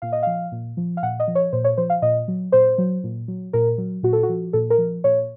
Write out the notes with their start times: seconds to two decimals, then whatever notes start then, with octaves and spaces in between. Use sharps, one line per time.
0.02 A#2 F5
0.12 D#5
0.23 F3 F5
0.52 A#2
0.77 F3
0.97 F5
1.03 A#2 F#5
1.20 D#5
1.28 F3
1.35 C#5
1.53 A#2 C5
1.65 C#5
1.78 F3 C5
1.90 F5
2.02 A#2 D#5
2.28 F#3
2.52 A#2 C5
2.78 F#3
3.04 A#2
3.28 F#3
3.53 A#2 A#4
3.78 F#3
4.03 A#2 F#4
4.13 A4
4.23 F#4
4.29 F3
4.53 A#2 A4
4.70 A#4
4.78 F3
5.04 A#2 C#5